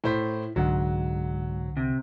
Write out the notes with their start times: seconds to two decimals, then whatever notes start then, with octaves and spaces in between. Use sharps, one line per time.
0.04 A2 E4 C5 B6
0.56 C2 G#2 D3 F#3 F#5
1.77 C3